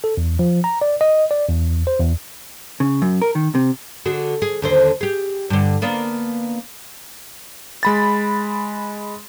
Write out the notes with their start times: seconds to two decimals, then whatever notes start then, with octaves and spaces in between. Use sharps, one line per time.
0.04 A4
0.17 E2
0.39 F3
0.64 A#5
0.81 D5
1.01 D#5
1.31 D5
1.49 E2
1.87 C5
1.99 E2
2.80 C#3
3.02 F#2
3.21 A#4
3.35 D#3
3.55 C3
4.05 D3 F#4 G#4
4.42 G#4
4.62 D#2 D3 C5
5.01 G4 G#4
5.50 G2 D3
5.82 A#3 B3 D4
7.83 G#3 B5 A6